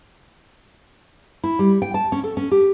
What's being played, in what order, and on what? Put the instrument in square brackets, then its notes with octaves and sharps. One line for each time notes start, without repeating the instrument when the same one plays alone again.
[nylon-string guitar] E4
G3
G5
A5
C#4
A4
C#4
G4